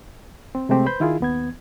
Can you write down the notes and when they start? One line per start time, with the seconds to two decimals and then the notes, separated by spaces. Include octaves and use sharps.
0.55 C4
0.69 C3 G#3 A3 C4 G4
0.86 B4 C5 B5 C6 G6
1.00 D#3 E4 F4 G#4
1.20 D#2 B3 G#6